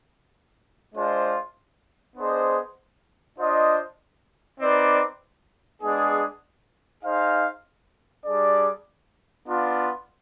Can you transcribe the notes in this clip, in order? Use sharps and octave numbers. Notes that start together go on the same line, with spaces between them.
G#3 D4 F4 C5
B3 D4 G#4 C5 D#5
D4 F4 C5 D#5
C4 D#4 B4 D5
G#3 B3 D4 G#4
D#4 G#4 C5 F5
G3 D4 G#4 D5
B3 D4 F4